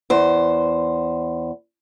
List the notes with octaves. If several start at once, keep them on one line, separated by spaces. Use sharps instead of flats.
E2 C5